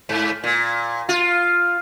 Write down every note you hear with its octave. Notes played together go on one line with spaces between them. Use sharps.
G#2
A#2
F4